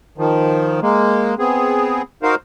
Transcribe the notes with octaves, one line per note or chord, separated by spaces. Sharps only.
D#3 F3
G#3 A#3
B3 C4 G#4
D#4 F#4 A#4 C5 F5